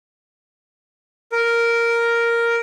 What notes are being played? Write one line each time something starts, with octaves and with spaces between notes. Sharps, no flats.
A#4